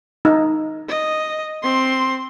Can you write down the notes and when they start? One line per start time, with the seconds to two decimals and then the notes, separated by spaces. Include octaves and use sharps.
0.25 D#4
0.88 D#5
1.62 C4 C6